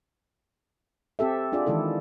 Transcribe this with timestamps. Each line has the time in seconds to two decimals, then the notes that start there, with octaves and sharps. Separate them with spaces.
1.19 C4 G4 A4 E5
1.52 D4 F4 G#4 D5
1.66 D#3 E3 G#3 E4 A4